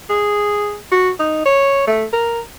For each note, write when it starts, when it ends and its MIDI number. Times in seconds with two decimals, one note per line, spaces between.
0.10 0.77 68
0.92 1.10 66
1.20 1.43 63
1.46 1.82 73
1.87 2.05 57
2.13 2.40 70